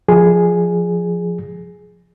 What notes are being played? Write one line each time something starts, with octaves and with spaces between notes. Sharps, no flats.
F3 G#4